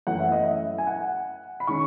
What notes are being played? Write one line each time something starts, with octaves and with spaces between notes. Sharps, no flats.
F#2 E3 A3 F#5
E5
D#5
E5
G#5
F#5
B5
D#3 G#3 C#4 C#6